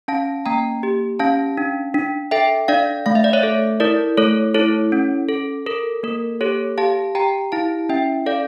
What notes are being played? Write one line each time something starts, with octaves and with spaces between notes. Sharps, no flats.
C#4 F5 A5
A#3 G5 A#5
G4
C#4 F5 A5
D4
D4
A4 E5 G5
D4 D5 F5
A3 F5
E5
D5
C#5 E5
A4
E4 A#4 D5
A3 A4 C#5
E4 A4 C#5
C#4
A4
A4 A#4
A#3 A#4
G4 A4 C#5
G4 F5 A5
G4 G5 A#5
E4 F5 A5
C#4 E5 G5
A4 D5 F5